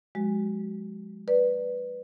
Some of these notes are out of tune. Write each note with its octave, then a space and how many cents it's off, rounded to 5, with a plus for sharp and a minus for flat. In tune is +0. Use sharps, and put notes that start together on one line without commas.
F3 +40 G#3 -5 F#4 +30
B4 +0 D5 +0